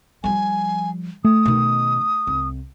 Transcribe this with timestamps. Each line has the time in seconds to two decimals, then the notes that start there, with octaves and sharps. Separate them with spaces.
0.24 F3 G3 G#5
1.24 A3 D#6
1.46 B2 D#3
2.27 C2